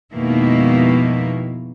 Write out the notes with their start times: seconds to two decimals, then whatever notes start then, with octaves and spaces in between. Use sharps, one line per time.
0.13 F2 B2 D#3 G#3 A#3 E4